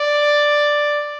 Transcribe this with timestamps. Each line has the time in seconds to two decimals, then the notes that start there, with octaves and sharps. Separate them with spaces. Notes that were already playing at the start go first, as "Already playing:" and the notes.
Already playing: D5